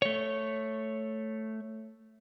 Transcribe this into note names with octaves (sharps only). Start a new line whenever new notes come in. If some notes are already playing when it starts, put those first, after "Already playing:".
A3 C#5